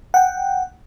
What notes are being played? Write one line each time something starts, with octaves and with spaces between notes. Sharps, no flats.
F#5 G5